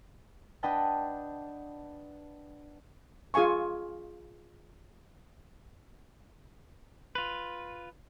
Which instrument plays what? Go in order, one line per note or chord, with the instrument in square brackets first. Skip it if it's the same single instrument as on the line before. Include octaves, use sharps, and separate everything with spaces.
[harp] D4 B4 D#5 F#5 G5 A5
[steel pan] F4 G#4 F5 G#5 C#6
[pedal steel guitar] F4 B4